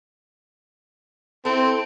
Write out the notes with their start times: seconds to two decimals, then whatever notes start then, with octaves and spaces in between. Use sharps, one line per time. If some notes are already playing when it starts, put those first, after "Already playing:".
1.45 C4 E4 A4